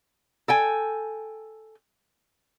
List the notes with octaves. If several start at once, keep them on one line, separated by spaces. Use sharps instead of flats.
A4 G5 G#5